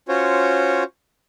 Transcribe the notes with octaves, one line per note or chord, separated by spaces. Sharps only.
C#4 F4 F#4 C5 C#5